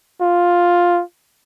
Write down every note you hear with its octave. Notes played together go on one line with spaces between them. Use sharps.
F4